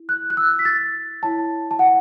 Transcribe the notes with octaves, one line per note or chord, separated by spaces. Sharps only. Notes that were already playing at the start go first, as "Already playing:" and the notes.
Already playing: E4
F#6
F#6
E6
B6
A6
E4 C#5 A5
A5
F#5